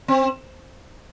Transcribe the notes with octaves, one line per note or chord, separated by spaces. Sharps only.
C4